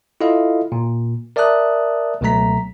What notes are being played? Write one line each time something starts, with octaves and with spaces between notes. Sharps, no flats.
E4 F4 A4 D#5 F5
A#2
A#4 D5 E5 A5 D#6 F#6
C#2 B2 F#3 A3 A#5 B6